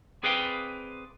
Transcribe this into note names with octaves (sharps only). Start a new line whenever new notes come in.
C4 G#4 B4 D5 F5 G5